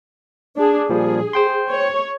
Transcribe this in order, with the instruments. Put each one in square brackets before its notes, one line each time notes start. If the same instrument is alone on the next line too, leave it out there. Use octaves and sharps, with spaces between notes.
[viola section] D4 G#4
[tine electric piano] A#2 F3 G3 [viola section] G#4
[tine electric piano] C5 G5 C6
[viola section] C#5